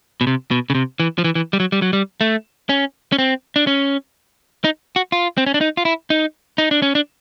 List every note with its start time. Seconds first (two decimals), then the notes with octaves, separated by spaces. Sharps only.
0.21 B2
0.27 C3
0.51 B2
0.70 C#3
0.75 C3
1.00 E3
1.18 F3
1.24 E3
1.35 E3
1.53 G3
1.60 F#3
1.72 G3
1.82 F#3
1.93 G3
2.21 A3
2.69 C#4
3.12 C#4
3.19 C4
3.56 D4
3.67 C#4
4.64 D#4
4.96 F#4
5.12 F4
5.38 C4
5.46 C#4
5.54 D4
5.61 D#4
5.77 F4
5.85 E4
6.10 D#4
6.58 D#4
6.71 D4
6.82 C#4
6.95 D4